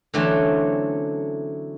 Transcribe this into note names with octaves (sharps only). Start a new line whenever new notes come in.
D3 E3 F#3 A3 C4 C#4